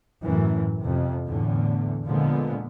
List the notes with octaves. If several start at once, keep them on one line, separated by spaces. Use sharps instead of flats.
F#2 A2 E3
F2 C3
E2 A2 D3
A#2 D3 F3 G#3 B3